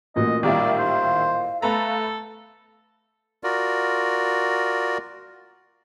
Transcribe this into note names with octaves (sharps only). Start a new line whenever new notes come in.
A1 A#2 F#4 D#5
D#3 G3 E4 D5 F5
C5
A3 A4 B4 A#5
F4 F#4 A#4 D5